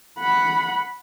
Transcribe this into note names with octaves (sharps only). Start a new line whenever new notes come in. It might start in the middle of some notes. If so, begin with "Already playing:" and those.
F#5 B5